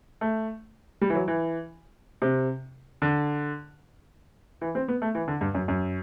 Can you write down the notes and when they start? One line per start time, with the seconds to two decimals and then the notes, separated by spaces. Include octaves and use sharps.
0.21 A3
1.01 G3
1.10 E3
1.15 F#3
1.28 E3
2.22 C3
3.02 D3
4.61 E3
4.75 C4
4.88 B3
5.02 A3
5.15 E3
5.28 D3
5.41 G2
5.55 F#2
5.68 F#2